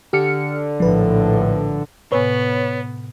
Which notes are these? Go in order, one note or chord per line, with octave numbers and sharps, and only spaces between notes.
D3 G4 F6 C#7
A#1 A2 F3 B4
A2 C3 B3 B4 C#5 G#5